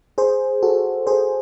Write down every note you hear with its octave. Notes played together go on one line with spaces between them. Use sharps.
G#4 C5
F#4 A4
G#4 C5